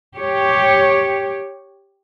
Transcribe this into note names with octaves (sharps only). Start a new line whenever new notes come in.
G4 C#5